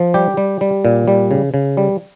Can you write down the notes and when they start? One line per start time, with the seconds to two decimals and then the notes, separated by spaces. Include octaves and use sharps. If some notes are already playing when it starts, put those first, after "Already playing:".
Already playing: F3
0.14 G3 G4
0.37 G3
0.61 G3
0.85 A#2
1.08 G3
1.31 C#3
1.54 C#3
1.77 G3